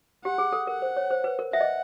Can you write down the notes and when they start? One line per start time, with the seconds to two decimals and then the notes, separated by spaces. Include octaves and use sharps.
0.25 G4 F#5
0.38 G#4
0.53 A4
0.67 A#4 F#5
0.82 C5
0.97 C#5
1.11 C5
1.24 B4
1.39 A#4
1.53 E5 F#5
1.61 D#5